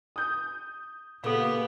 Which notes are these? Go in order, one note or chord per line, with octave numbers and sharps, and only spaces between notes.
D#6 G6
A#2 C#3 A#3 B3 G4 A4 F5